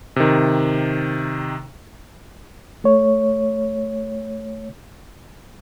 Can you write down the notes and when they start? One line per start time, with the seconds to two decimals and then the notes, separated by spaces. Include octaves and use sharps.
0.16 C3 D#3
2.84 A3 C#5